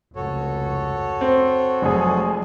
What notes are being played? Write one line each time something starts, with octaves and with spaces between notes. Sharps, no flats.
F1 C#2 G2 F#4 A4 C#5
C4
F1 F3 F#3 G#3 G#4